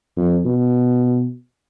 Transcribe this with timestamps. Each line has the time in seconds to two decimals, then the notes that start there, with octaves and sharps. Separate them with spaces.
0.17 F2
0.45 B2